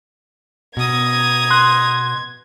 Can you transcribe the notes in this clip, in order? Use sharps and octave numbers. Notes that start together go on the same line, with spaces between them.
B2 A#5 D#6 G#6
C6 F#6